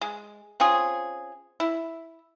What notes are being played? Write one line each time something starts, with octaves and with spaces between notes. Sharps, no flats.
G#3
C4 C#4 F4 G#4
E4